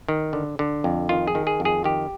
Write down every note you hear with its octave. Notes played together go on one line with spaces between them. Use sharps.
D#3
D3
D3
F2
D#3 F4
G#4
D#3
G#4
F2
G#4
D#3 G4